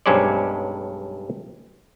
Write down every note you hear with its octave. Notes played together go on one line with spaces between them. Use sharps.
B1 G2 G#3 C#4 C5 D5